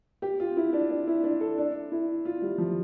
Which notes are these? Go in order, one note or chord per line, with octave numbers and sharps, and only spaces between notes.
G4
F4
E4
D4
D4
E4
D4
A4
D4
E4
F4
G3
F3